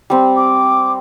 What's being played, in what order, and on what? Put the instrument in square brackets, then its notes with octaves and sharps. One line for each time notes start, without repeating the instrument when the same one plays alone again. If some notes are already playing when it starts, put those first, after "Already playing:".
[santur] G3 C4
[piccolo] D6